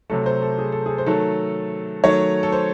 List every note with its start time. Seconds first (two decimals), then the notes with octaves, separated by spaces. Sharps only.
0.10 C3 F#3 A3 A4
0.26 C5
0.42 A4
0.58 G#4
0.72 A4
0.86 G#4
0.98 C5
1.06 D#3 F#3 A3 A4
2.04 D#3 F#3 A3 C#5
2.43 A4
2.52 C5